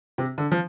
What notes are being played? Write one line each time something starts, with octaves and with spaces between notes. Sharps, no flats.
C3
D3
F3